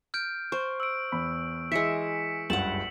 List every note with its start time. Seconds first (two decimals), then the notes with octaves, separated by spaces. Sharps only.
0.14 F6 G6 D7
0.52 C5 C#6
0.80 E6 D7
1.12 E2 B5
1.72 E3 G#3 E5 B6 C#7 E7
2.50 F#1 C#2 G2 F#5 A5 F#7